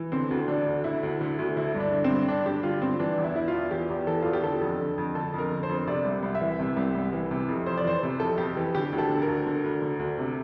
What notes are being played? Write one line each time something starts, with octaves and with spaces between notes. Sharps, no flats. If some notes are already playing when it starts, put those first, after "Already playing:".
Already playing: E3
D3 C4
D2
D3 D4
D2
D3 E4
D2
D3
D2
D3 E4
G2
D4
D3
C4
G2
D3 D4
G2 G4
D3 F4
G2 C4
E3 D4
E2
E4
E3 E4
F4
E2
E3 G4
E2
E3 A4
E2 F4
G4
D3 A4
F2
D3
F2
D3 A4
F2 A#4
D3
C5
F2
C3 D5
C2
C2
E5
E3
C3
C2
C2
E3
C3
F2
F2 C5
D5
E3 C5
C3
F2 A4
F2 G4
E3
D3 G4
D2
A4
D3
A#4
D2
D3
D2
D3
D2
C3